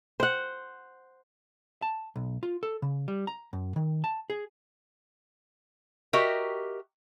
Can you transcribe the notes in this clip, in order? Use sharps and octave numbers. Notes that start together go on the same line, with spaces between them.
C5 F#5
A5
B1
F4
A4
C#3
G3
A#5
F#2
D#3
A5
G#4
F#4 G4 A#4 D#5 E5 G5